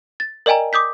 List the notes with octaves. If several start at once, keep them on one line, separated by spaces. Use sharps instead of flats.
A6
A#4 D5 D#5 G5 G#5 A#5
D6 D#6 G6 B6